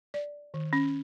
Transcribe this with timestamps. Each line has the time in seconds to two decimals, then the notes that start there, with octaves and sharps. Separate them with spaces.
0.14 D5
0.54 D#3
0.73 C#4